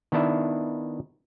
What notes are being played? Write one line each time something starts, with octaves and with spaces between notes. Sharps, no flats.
D#3 B3 D4 E4 E5